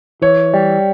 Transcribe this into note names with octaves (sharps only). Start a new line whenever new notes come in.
E3 C#5
G3